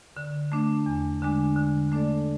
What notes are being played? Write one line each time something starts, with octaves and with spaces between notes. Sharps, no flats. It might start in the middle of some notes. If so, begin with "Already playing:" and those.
D3
A3 D4
E2
D3 G#3 D4
D3
A3 D4 A4 D5